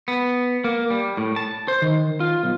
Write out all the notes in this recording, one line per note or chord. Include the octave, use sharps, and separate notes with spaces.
B3
A#3
G3
A2
A5
C5
D#3
F4
B1